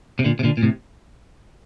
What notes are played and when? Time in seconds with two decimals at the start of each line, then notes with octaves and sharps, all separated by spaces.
0.19 C3
0.24 A#2 D3
0.39 C3
0.43 A#2 D3
0.57 A#2
0.63 A2 C3